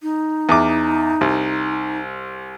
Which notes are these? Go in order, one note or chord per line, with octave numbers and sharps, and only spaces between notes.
D#4
E2 D6
C2